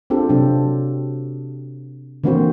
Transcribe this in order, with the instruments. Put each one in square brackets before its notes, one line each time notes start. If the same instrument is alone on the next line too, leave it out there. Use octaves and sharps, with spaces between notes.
[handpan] C4 D4 F4 G4 A4
C3 F#3 C4 D4
D3 E3 A#3 C4 F#4 C5